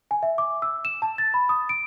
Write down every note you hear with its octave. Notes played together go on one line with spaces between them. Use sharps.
G#5
E5
D6
E6
E7
A5
A6
B5
D#6
D7